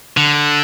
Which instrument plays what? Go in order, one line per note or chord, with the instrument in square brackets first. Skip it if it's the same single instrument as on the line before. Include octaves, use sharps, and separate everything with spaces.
[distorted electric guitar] D3